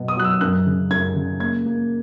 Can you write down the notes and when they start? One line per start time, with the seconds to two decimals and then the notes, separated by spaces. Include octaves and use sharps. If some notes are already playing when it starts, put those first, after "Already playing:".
Already playing: B2 F#3 B3
0.08 D#6
0.17 F#3 F#6
0.24 E6
0.41 F#2 F#6
0.66 C#3
0.90 F#2 G#6
1.16 C#3
1.40 A#3 G#6
1.65 A#3